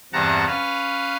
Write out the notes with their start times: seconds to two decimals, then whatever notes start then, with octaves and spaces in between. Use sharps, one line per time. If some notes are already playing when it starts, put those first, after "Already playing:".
0.13 E2 G2 C3 F#5 A5 A#5
0.47 C#4 B4 F5